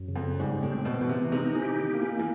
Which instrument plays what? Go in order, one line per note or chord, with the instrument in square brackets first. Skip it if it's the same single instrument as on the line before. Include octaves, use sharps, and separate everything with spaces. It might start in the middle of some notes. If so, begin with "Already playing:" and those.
Already playing: [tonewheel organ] F#2
C#3
[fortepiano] F2
[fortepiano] G#2 [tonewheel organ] G3
[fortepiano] A2
[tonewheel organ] C4
[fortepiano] B2
[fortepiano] B2 [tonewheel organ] E3
[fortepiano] C3
[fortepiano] C3 [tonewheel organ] D#4
[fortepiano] D#3
E3
[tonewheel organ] G4
[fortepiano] D#3
[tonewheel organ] A#3
[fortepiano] E3
E3